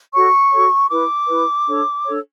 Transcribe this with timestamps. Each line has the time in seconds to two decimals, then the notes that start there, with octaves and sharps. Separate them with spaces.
0.13 F#4 A4 C#5 C#6
0.52 F#4 A4 C#5
0.91 E4 B4 D6
1.28 E4 B4
1.67 D4 A4 C#5
2.05 D4 A4 C#5